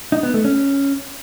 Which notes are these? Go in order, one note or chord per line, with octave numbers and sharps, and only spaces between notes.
D#4
B3
A3
C#4